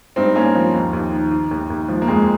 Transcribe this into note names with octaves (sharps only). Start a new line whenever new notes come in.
G2 C4 D#4
G2 A#3 C#4
F3
D#2
D#2
D#3
D#3
D#2
D#2
F3
A#3
F2 G#3